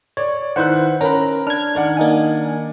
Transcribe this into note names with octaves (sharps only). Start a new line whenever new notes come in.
C#5 D5
D#3 E4 B4 C5 F#5 F#6
C#4 A#4 A#5 B5
D4 F6 G#6
D#3 D5 F#5
A#3 D#4 G#5